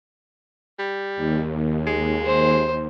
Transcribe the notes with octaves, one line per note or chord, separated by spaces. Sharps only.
G3
D#2
G#3
C5